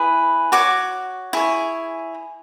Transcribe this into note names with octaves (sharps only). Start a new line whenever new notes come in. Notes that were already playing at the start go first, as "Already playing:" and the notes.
Already playing: E4 G#4 B4
F#4 C#5 D6
E4 G#4 C#5